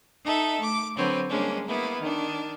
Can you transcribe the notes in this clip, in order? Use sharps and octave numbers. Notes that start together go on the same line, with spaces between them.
D#4 A4 E5
A3 D6
D3 F#3 C4 B4 C#5
G3 G#3 A#3 C#4 D4
A#3 B3 E4
D#3 D4